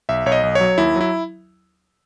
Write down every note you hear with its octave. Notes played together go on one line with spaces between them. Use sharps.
B1 E5
B1 C#5
D#5
B1
C#5
F#3
D#2 E4
F#3 E4